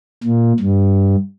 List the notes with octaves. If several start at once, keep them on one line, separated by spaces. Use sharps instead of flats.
A#2
G2